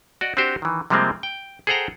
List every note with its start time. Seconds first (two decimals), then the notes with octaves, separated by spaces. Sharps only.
0.21 F#4 D5 D#5
0.37 C4 D4 F#4 G4 C5
0.62 D#3 E3
0.90 C3 F3 G3 G#3 A#3 C4
1.23 G5
1.67 G#4 A4 C5 F#5 G5 A#5